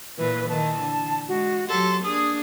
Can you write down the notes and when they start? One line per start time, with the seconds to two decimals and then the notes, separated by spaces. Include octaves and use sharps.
0.18 A#2 E3 B4
0.49 D#3 E3 A5
0.80 D3
1.28 G#3 F#4
1.69 F#3 G4 A4 C6
2.04 A#3 D4 G#4 D#6